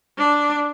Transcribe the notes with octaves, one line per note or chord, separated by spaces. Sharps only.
D4